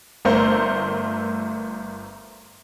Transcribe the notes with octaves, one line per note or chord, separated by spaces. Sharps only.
G1 A3 A#4 C5